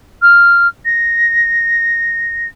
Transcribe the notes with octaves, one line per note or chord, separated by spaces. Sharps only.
F6
A#6